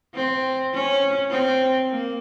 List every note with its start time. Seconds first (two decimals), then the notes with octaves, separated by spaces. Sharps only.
0.15 C4
0.73 C#4
1.31 C4
1.90 A#3